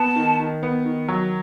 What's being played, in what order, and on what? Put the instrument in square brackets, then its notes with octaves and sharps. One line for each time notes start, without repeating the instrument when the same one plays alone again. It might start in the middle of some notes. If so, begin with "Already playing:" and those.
Already playing: [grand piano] B3 [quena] A5
[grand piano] D#3
D#3
B3
D#3
F#3